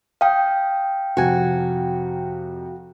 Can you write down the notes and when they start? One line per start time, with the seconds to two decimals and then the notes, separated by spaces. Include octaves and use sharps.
0.21 F5 G5 D#6
1.17 F2 C3 F#4 G#5